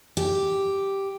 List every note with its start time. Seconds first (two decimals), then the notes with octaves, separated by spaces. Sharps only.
0.17 G4